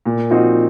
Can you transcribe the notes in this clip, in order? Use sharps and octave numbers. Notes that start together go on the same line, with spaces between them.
A#2
F3 C4 D#4 F#4